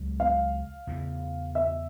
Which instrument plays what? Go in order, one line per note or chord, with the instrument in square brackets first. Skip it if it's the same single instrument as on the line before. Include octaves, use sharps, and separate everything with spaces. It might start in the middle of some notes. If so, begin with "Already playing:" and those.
Already playing: [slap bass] C#2 C#3 F#3
[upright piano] F5
[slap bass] E2 C#3 E3
[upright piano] E5